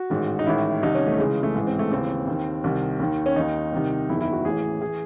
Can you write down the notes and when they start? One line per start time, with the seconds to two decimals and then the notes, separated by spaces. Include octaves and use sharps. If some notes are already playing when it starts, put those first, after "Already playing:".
Already playing: F#4
0.10 A1 G#2 D#3
0.39 D#4
0.46 A1 G#2 D#3 E4
0.83 C2 C3 D#3 D#4
0.95 C#4
1.07 A3
1.18 C#2 C#3 E3 G#3
1.43 A3
1.55 A1 G#2 E3 G#3
1.67 C4
1.79 A3
1.92 D#2 C#3 E3 C4
2.27 D#2 D#3
2.64 C2 C3 D#3
3.00 D#2 D#3
3.26 C#4
3.36 D#2 D#3 D#4
3.72 C2 C3 D#3
4.09 F#1 E2 D#3 E4
4.21 E4
4.32 F#4
4.45 A1 A2 E3 G#4
4.81 E3 G#4